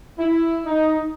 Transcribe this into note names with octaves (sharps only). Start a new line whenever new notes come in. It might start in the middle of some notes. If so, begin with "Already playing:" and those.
E4
D#4